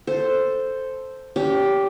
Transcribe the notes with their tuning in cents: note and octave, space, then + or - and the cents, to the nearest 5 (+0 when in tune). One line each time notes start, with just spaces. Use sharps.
A4 +0 C5 +0
C#4 +40 G4 +0